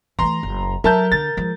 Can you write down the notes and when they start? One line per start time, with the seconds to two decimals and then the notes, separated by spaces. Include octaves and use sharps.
0.19 E3 A3 A#5 C6
0.43 F#1
0.84 F#3 A#4 E5 A5 G6
1.12 D3 A6
1.37 F3 G#3